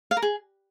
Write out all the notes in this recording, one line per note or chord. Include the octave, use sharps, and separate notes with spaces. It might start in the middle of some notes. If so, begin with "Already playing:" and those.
F5
A#4
G#4